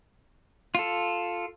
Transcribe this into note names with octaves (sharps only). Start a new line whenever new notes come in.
F4 A4